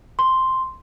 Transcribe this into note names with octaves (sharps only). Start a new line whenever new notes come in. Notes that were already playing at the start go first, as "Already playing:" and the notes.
C6